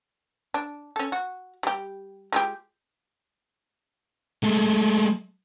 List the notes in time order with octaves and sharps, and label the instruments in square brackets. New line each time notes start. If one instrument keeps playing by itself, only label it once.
[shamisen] D4
C#4 A4
F#4
G3 G4
G#3 F4 G4
[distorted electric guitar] G#3 A3